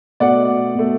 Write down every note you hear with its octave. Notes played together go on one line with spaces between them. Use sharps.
B2 A3 D5 F#5
B2 A3